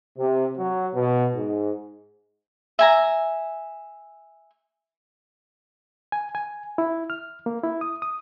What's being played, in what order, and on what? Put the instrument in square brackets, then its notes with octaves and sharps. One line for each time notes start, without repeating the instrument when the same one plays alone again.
[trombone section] C3
F#3
B2
G#2
[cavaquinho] E5 G#5 A#5
[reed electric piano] G#5
G#5
E4
F6
A#3
E4
D#6
D#6